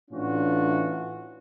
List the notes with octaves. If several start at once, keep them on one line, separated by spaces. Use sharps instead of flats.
A2 E3 C#4 D4 F4 F#4